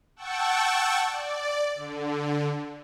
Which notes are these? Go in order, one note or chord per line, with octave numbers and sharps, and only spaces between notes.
F#5 G5 A5 C#6 E6
D5
D3